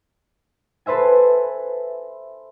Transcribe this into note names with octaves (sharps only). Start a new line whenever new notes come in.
A4 B4 C5 E5 G#5